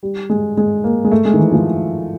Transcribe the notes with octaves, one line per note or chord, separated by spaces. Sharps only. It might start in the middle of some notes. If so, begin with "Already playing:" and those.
G3
G#3
G#3
A#3
G#3
A3
G#3
D#3
E3
F3